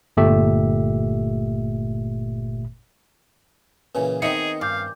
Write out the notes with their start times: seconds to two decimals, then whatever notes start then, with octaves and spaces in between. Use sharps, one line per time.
0.17 G1 A#2 A3 G4 E5
3.95 A#2 C#3 E3 B4 C#5 G#5
4.22 D#3 B3 C4 D#4 G#4 E5 C#7
4.61 G2 F5 G#5 D6 G6